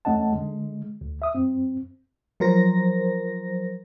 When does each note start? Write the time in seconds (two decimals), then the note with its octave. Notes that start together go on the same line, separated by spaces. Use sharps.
0.05 E2 A3 C#4 D#5 F#5 A5
0.33 D3 G#3
1.01 D2
1.22 E5 D#6
1.35 F#2 C4
2.40 F3 F#3 A#4 C5 A#6